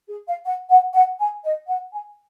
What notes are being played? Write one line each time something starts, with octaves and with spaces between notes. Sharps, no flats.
G#4
F5
F#5
F#5
F#5
G#5
D#5
F#5
G#5